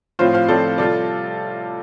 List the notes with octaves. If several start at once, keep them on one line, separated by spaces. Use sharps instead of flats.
A2 F3 C4 F4 C5 F5
C5 F5
A2 F3 C4 F4 A4 D5
C3 G3 F4 A4 D5